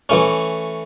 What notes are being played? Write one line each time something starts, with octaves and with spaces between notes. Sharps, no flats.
E3 A3 C#4